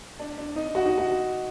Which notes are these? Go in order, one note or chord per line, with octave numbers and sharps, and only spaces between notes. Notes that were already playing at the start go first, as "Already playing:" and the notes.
D4
D4
D#4
F#4
D#4
F#4